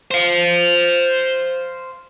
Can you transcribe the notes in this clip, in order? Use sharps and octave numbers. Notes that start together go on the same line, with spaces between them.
C5 F5